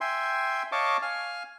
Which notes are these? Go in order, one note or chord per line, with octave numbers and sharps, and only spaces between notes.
E5 G5 G#5 C6
C#5 D#5 F5 A5 C#6 D6
F5 G#5 F6